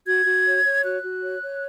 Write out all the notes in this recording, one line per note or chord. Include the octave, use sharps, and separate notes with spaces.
F#4 G#6
F#4
C#5
C#5
F#4 F#6
F#4
C#5
C#5